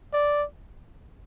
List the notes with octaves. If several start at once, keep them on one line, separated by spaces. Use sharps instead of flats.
D5